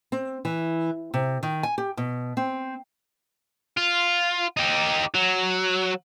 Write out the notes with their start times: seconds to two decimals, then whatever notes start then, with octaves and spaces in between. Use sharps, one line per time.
0.12 C4
0.45 E3
1.14 C3
1.43 D#3
1.63 G#5
1.78 G4
1.97 B2
2.37 C4
3.77 F4
4.57 D#4 G4
5.14 F#3